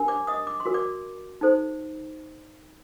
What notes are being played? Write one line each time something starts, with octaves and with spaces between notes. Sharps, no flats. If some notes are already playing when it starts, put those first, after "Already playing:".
Already playing: D4 G4 A#4
D5 D6
D#5 D#6
D6
C6
F#4 A#4
D5 D6
D#4 A4 C5